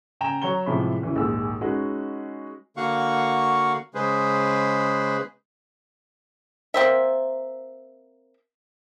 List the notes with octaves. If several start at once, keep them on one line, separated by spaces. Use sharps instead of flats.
C#3 G5 G#5 A#5 E7
F#3 C#5 A#5 G7
A2 C3 E3 F3 G#3 B5
E2 C#3 E3
A#1 D#2 G#2 E6
G#3 C#4 D#4 F#4 B4
D3 A#3 F#4 F5 F#5 C#6
C#3 G#3 G#4 B4 C5
A#3 C4 C5 E5